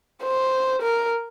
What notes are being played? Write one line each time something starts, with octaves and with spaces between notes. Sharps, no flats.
C5
A#4